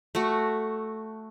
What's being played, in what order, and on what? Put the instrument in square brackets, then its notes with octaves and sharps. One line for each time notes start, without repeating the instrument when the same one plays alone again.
[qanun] A3 F#4